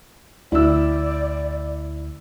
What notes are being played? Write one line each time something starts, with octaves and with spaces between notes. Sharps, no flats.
D2 E4 D5 E6